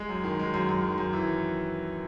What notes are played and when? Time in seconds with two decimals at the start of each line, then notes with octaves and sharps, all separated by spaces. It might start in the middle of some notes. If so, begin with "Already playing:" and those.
Already playing: G#3
0.09 F#2
0.24 D#3
0.39 G#3
0.54 F#2
0.69 F#2
0.83 D#3
0.98 F#2
1.13 E3